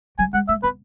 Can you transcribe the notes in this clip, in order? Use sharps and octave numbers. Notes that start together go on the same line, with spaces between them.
F#3 G#5
G#3 F#5
A3 E5
B3 B4